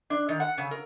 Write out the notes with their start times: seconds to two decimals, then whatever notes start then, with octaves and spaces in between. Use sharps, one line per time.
0.10 D4
0.29 D#3
0.40 F#5
0.58 C#3
0.71 A#4